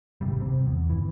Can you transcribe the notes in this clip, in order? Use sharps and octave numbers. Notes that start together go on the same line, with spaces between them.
G#1 C3 G3
C3 C4
E2
G1 E3